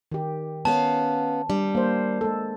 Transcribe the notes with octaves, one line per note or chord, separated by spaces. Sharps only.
D#3 G4
B3 C#4 F5 A5
G3 D4
A#3 C5
G#3 A4